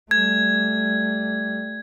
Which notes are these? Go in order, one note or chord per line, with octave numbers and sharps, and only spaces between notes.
G3 A3 G#6